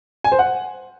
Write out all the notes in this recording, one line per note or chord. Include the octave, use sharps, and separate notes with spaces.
G#5
C5
F#5